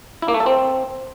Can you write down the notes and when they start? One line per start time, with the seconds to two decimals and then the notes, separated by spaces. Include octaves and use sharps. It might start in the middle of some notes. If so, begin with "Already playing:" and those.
0.22 E4
0.28 A#3
0.34 A3
0.40 A4
0.46 C4